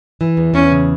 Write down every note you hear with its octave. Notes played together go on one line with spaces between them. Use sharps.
E3
E2
E2 C#4
C#3